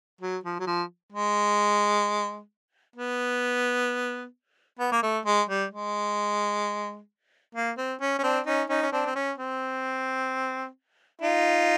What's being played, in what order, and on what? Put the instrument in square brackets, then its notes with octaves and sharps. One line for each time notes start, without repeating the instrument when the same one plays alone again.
[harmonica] F#3
F3
F#3
F3
G#3
B3
B3
A#3
A3
G#3
G3
G#3
A#3
C4
C#4
C#4
C4 D4
C#4 D#4
C#4 D#4
C#4
C4 D4
C4
C#4
C4
D#4 F4